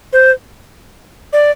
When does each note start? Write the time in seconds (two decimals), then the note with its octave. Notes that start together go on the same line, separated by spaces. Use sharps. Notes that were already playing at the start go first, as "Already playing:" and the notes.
0.13 C5
1.33 D5